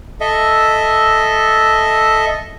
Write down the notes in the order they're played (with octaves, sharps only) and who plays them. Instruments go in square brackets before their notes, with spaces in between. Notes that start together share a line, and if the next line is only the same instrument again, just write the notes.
[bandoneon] A4 D#5 E5